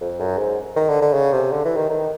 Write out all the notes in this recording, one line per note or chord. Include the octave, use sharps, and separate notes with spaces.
F2
F#2
G#2
D#3
D3
D3
C#3
C3
D3
E3
D#3
D#3